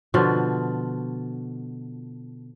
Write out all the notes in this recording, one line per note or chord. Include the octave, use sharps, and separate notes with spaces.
B2 D3 F3 F4